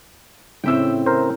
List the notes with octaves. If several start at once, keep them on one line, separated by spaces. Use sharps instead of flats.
A2 C#3 C4 E5 G5 E6
A#4 C5